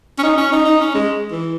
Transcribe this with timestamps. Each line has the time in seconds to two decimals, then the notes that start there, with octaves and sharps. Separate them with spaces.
0.18 C#4
0.23 D#4
0.38 C#4
0.52 D#4
0.66 D#4
0.81 C#4
0.94 G#3
1.31 E3